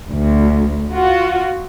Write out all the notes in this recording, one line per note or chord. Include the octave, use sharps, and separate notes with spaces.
D2
F4 F#4